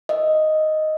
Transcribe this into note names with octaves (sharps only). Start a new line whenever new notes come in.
D#5 E5